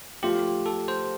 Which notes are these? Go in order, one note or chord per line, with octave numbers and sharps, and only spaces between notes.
F3 A3 F4 G4
A4
C5